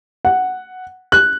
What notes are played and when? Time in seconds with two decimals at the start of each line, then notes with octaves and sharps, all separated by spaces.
0.25 F#5
1.12 F#6